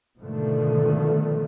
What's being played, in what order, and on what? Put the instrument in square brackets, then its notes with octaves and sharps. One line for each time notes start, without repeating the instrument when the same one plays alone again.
[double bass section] G#2 B2 D3 D#3 F3 A3